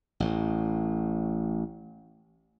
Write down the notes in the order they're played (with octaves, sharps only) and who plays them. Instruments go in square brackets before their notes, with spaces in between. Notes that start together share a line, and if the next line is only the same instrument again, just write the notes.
[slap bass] A1 A2